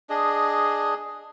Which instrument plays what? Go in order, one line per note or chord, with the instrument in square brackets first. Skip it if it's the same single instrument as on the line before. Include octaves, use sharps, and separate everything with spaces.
[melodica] D4 G#4 D#5